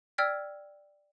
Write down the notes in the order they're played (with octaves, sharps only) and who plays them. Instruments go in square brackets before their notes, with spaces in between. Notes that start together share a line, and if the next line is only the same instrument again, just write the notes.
[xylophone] D5 G5 E6 F6 G#6 B6